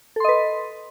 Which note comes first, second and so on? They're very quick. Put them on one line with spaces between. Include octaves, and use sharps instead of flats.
A4 C6 D#5 B4